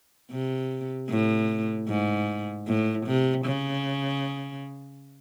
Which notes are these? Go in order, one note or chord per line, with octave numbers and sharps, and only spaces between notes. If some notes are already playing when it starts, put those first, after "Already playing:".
C3
A2
G#2
A2
C3
C#3